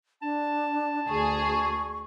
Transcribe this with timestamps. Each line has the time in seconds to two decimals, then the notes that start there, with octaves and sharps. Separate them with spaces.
0.22 D4 A5
1.09 D2 G#4 C#6